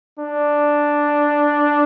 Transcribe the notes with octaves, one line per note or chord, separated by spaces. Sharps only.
D4